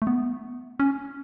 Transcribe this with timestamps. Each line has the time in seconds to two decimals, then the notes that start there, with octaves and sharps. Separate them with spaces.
0.02 A3
0.07 B3
0.80 C#4